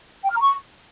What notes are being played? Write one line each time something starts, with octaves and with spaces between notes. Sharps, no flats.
G5
F6
A#5
C#6